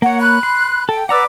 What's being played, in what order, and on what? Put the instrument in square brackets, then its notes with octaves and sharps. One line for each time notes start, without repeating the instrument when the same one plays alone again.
[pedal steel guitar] A#3 C#5 [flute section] F#5
[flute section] B5 F#6
[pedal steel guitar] C6
[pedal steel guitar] A4 [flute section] G5
[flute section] B4 D5 D6 [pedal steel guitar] F#5 A#5 E6